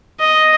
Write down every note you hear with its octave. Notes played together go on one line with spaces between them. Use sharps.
D#5